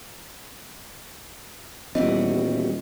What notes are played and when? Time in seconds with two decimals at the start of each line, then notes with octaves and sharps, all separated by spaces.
1.95 D#1 E3 G3 B3 F#4 D#5